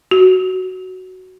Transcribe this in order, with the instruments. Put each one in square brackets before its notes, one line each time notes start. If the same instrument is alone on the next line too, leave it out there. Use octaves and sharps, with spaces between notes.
[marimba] F#4